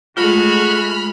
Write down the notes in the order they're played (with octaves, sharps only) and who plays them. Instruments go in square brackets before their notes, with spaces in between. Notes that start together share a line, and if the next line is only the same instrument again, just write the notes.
[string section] G#3 A3 [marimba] F4 [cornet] F#4 [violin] B5 F6